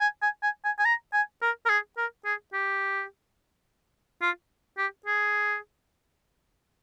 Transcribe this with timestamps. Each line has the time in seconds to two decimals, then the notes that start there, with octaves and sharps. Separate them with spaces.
0.01 G#5
0.22 G#5
0.43 G#5
0.65 G#5
0.79 G#5
0.85 A#5
1.13 G#5
1.42 A#4
1.66 A#4
1.70 G#4
1.98 A#4
2.25 G#4
2.53 G4
4.22 F4
4.78 G4
5.06 G#4